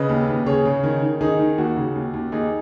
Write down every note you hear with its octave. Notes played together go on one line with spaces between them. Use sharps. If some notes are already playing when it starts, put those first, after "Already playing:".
Already playing: C#3 B4 D#5
D#2
D#2
C#3 G#4 C#5
C#3
D#3
D#3
D#3 D#4 G#4
D#3
D#2 F#4
C#3
D#2
D#2
D#2 D#4 G#4